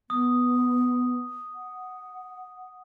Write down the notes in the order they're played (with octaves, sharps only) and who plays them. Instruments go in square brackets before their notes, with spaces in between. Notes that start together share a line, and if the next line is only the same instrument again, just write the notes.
[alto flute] B3 [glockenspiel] D#6
[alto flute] F#5